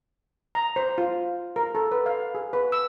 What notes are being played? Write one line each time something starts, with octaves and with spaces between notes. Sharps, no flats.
A#5
C5
F4
A#4
A4
B4
F5
G#4
B4
E6